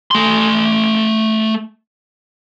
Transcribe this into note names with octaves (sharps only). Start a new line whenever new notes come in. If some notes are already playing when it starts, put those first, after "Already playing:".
A3 C6